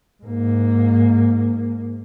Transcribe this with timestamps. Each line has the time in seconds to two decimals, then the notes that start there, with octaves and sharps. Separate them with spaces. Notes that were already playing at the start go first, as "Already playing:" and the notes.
0.23 G#2 A#3